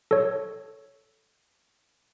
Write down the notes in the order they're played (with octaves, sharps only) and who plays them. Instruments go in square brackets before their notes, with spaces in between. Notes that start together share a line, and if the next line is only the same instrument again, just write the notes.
[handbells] A4 C#5